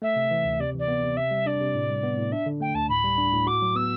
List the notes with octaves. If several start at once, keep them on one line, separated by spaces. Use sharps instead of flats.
A3 E5
C3
E3
D2
C3 D5
E3 D5
B3
C3
C3 E5
G3
D4 D5
C3
A2
G3
B3
A2
D4 E5
D3
A3 G5
D2 A5
A2 B5
G3
D4
A2
F#4 D6
F#3
B3 E6